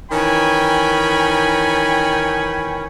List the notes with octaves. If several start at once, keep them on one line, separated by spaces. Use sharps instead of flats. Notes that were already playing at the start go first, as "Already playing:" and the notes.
D#3 E3 C#4 G5 G#5 B5